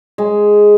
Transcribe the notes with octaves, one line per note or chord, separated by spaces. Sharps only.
G#3